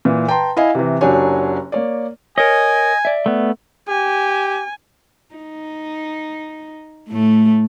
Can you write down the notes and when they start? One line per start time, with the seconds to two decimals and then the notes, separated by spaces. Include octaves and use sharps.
0.05 A#2 E3
0.28 B4 G5 A5 A#5 C6
0.57 E4 D#5 F5 G#5
0.75 C3 E3
1.01 F#1 F#3 D4 G4 C#5 G#5
1.72 A#3 C#5 D5
2.38 A#4 C#5 D#5 G#5
3.05 D5 E5
3.26 A3 B3
3.88 G4 G#5
5.35 D#4
7.08 A2 A3